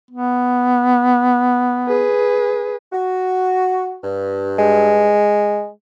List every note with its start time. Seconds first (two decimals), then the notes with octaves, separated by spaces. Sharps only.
0.11 B3
1.87 G#4 B4
2.93 F#4
4.04 G2
4.59 G#3